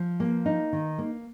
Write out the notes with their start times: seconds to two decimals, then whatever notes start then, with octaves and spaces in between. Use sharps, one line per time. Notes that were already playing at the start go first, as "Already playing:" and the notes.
Already playing: F3
0.20 A#3
0.46 D#4
0.73 D#3
0.98 A#3